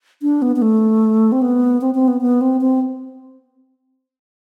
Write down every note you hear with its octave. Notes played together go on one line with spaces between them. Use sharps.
D4
B3
B3
A3
C4
B3
C4
C4
B3
B3
C4
C4